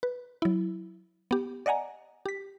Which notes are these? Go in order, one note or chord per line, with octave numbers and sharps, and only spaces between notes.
B4
F#3 E4
B3 G4
D5 D#5 F#5 G#5 A#5
G4 B6